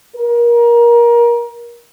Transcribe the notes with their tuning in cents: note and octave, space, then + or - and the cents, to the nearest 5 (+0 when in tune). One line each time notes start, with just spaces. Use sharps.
A#4 +25